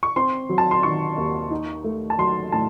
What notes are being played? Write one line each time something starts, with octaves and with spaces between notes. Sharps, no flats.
C#6
C4 C6
F#3
A5
C6
D#3 C#6
D#2
D#4
A3
A5
F#3 C6
A2 A5